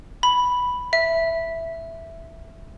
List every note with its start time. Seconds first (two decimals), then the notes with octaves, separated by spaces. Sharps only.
0.23 B5
0.93 E5